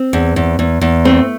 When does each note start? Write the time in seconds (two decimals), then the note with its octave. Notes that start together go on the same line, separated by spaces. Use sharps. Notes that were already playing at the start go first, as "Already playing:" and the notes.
Already playing: C4
0.13 E2
0.36 E2
0.59 E2
0.81 E2
1.05 A3 C4